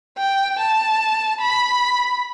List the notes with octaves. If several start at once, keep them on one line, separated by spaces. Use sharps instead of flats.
G5
A5
B5